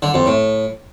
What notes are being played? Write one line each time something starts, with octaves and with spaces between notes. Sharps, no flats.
D3
F2
A2